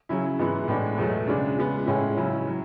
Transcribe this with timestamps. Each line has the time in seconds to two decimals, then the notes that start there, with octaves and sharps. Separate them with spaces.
0.09 C#3 F#3 C#4 E4
0.39 G#2 E3 B3 E4
0.68 A2 G#3 B3 D4
0.97 E2 B2 F#3 A3
1.27 C#3 G#3 D4
1.57 C#3 G#3 B3
1.86 A2 G#3 C#4 E4
2.17 C#3 F#3 C#4 E4
2.47 F#3